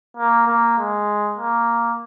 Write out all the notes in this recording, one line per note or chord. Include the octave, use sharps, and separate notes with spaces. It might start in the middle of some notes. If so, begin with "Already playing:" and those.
A#3
A#3
G#3
A#3